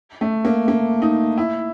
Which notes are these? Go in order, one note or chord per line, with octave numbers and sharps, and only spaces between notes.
A3
A#3
A#3
D#4
E4